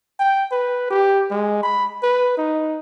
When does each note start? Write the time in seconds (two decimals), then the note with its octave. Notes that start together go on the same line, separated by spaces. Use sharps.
0.19 G5
0.52 B4
0.90 G4
1.31 G#3
1.63 B5
2.03 B4
2.38 D#4